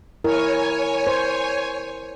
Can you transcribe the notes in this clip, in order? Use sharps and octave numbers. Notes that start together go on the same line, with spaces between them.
E4 A#4 C#5 G#5
C5